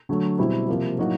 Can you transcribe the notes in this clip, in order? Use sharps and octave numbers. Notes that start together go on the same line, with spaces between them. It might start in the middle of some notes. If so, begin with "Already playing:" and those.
D3 F#3 A3
B2 G3 C4 E4
C3 F3 A#3
A2 F#3 A#3 D#4 F#4